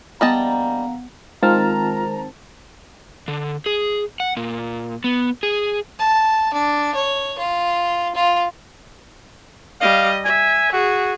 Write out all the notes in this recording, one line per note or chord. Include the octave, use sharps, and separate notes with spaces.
A#1 G3 B3 D#5 F5 F#5 A5 A#5
D#3 G#3 C4 F4 A#4 A5 A#5 F6
D3
G#4
F#5
A#2
B3
G#4
A5
D4
C#5
F4
F4
G3 D#5 F5
E5 G#5
F#4 G#4